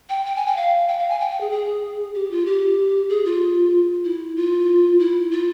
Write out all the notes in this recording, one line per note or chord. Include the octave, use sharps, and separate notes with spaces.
G5
G5
G#5
G5
F5
G5
F5
G#5
G5
G5
G#4
G#4
G4
F4
G4
G#4
F4
E4
F4
E4
F4